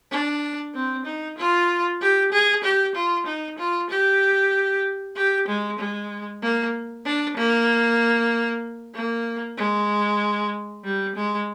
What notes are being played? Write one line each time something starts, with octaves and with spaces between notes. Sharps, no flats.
D4
C4
D#4
F4
G4
G#4
G4
F4
D#4
F4
G4
G4
G#3
G#3
A#3
D4
A#3
A#3
G#3
G3
G#3